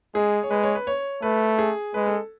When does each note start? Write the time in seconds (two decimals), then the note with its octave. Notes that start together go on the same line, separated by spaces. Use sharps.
0.15 G#3 G#4
0.43 C#5
0.50 G#3 B4
0.63 C#5
0.75 B4
0.87 C#5
1.22 A3 B4
1.59 G#4
1.94 G#3 B4
2.06 A4